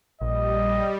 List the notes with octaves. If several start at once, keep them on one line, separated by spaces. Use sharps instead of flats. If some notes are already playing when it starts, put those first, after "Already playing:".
A#1 G3 D#5